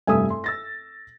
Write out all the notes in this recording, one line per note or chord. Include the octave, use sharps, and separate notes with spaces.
F1 G2 A4 E5 G#5 D#6
C6
E6 A6 A#6